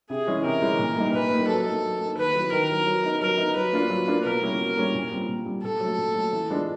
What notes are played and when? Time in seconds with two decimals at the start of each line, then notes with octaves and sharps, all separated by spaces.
0.10 C3 G#4
0.27 E3 G#3 C#4 E4
0.44 C3 A#4
0.62 E3 G#3 C#4 E4
0.79 A#2
0.96 G3 A#3 D#4
1.13 A#2 B4
1.31 G3 A#3 D#4
1.48 F#3 A4
1.66 A#3 D#4
1.83 F#3
2.00 A#3 D#4
2.17 D#3 B4
2.35 F#3 B3 E4
2.52 D#3 A#4
2.69 F#3 B3 E4
2.86 F#3
3.04 B3 D#4
3.21 F#3 A#4
3.38 B3 D#4
3.56 F#3 B4
3.73 A#3 D4 F4
3.90 F#3
4.08 A#3 D4 F4
4.25 B2 A#4
4.42 G3 A#3 C#4 E4
4.60 B2
4.77 G3 A#3 C#4 E4
4.94 A#2
5.11 G3 C4 F4
5.28 A#2
5.46 G3 C4 F4
5.63 A#2 A4
5.80 F#3 A3
5.98 A#2
6.15 F#3 A3
6.33 E3
6.50 G#3 B3 D4 F4